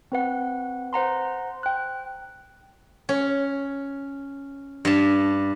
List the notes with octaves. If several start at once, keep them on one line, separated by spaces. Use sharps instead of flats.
C4 B4 F#5
C5 F#5 A#5 C6
G5 F#6
C#4
G2 A5